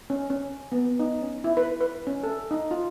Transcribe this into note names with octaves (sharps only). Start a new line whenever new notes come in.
C#4
C#4
B3
D#4
C#4
E4
B4
B4
C#4
A4
D#4
F4